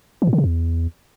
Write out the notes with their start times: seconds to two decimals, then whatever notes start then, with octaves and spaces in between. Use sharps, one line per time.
0.22 E3
0.27 A2
0.33 D3
0.38 C3
0.44 E2